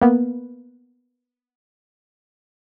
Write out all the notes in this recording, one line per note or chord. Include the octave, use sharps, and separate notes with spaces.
A#3 B3